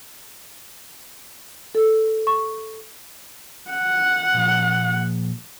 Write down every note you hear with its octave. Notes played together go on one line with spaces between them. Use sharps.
A4
C#6
F#5
A#2 F3